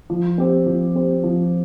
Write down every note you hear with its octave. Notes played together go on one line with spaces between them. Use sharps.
F3
C4 G4 C5
F3
C4 G4 C5
F3